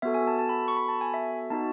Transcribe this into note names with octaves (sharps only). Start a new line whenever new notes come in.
B3 F#4 A4 E5
G#5
A5
A5
B5
C#6
B5
A5
G#5
E5
B3 D#4 F#4 A5